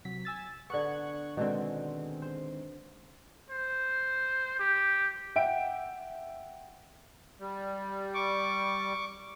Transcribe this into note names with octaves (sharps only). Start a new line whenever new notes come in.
C3 F#3 B6
G#5 E6 A6
D3 B3 C#6 F#6 G#6
B2 D3 D#3 G#3 C4
C5
C5
G4
E5 F#5 G5 D7
G3
C#6 D6